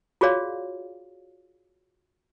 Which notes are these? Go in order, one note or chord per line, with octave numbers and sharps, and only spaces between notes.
F4 F#4 G#4 C#5 D5 F5